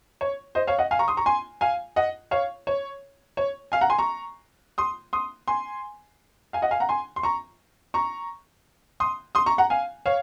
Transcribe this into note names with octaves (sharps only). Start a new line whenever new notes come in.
C#5
C5 D#5
C#5 F5
D#5 F#5
F5 G#5
A#5 C#6
C6 D#6
A#5 C#6
G#5 C6
F5 G#5
D#5 F#5
C#5 F5
C#5
C#5
F5 G#5
F#5 A#5
G#5 C6
A#5 C#6
C6 D#6
C6 D#6
G#5 C6
F5 G#5
D#5 F#5
F5 G#5
F#5 A#5
G#5 C6
C6
A#5 C#6
A#5 C#6
C6 D#6
C6 D#6
A#5 C#6
F#5 A#5
F5 G#5
C#5 F5